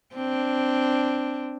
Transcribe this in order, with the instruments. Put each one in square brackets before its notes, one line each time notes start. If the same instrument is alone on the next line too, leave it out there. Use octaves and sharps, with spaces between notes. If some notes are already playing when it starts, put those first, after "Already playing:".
[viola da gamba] C4 D4